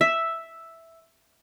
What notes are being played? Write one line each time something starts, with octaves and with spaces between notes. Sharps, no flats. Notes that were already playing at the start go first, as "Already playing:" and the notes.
E5